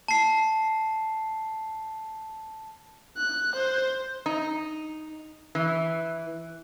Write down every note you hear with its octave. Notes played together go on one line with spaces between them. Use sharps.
A5 C7
F#6
C5
D#4
E3